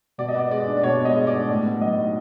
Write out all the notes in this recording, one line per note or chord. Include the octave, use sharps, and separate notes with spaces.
B2 D5
D#5
B3 D5
G#3 D5
D4
D5
B2 C#5
B3
D#5
G#3
D5
D4
A2 D5
B3
F#3 D#5
D#4